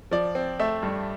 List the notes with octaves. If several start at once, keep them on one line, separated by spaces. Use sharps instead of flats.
F3 D5
C4
A3 E5
G2